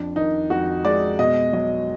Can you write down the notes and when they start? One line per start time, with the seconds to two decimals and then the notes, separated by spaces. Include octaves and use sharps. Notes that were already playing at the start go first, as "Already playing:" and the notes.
Already playing: F2 D4
0.16 D#3 D#4
0.50 F2 F#4
0.85 G#3 D5
1.19 B2 D#5
1.53 F#3 D#5